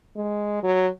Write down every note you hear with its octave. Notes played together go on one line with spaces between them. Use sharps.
G#3
F#3